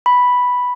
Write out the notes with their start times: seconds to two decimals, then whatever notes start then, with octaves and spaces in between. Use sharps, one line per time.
0.06 B5